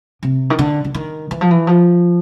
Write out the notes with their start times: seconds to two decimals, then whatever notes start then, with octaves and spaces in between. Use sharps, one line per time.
0.23 C3
0.50 D#3
0.59 D3
0.85 D3
0.95 D#3
1.31 E3
1.41 F3
1.51 E3
1.67 F3